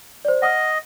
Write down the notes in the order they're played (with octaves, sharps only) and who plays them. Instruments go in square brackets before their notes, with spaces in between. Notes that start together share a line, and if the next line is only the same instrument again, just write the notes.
[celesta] C5 D5
[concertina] D#5 [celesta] F#5 D#6 F6